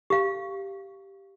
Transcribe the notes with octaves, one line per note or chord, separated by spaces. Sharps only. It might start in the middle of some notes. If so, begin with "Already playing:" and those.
G4 F5